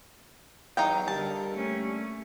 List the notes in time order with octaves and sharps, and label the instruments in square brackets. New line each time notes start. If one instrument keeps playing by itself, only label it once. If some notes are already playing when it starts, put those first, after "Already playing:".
[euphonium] E2 [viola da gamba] F#3 [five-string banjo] D#4 F5 G5
[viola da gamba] D3 A#4 [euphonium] G3 [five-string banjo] A5
[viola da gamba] A3 A#3 C#4